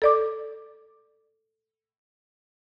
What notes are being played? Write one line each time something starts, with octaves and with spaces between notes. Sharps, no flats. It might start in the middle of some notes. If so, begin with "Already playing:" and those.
A4 D5 D6